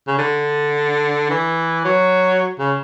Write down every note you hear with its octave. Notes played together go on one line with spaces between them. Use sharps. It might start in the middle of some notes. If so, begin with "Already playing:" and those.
C#3
D3
E3
F#3
C#3